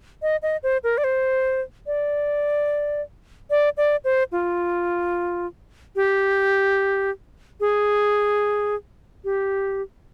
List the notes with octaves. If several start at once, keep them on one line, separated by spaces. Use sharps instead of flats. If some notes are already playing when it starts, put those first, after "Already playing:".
D#5
D#5
C5
A#4
D5
C5
D5
D5
D5
C5
F4
G4
G#4
G4